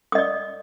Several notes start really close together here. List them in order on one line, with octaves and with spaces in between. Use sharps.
D#6 D#5 D5